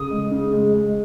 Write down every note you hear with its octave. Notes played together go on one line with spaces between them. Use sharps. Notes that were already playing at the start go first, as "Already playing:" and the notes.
Already playing: C#3 D#6
G#3
C#3
G#3
G#3